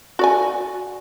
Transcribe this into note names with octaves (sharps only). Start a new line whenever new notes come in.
F#4 D5 G#5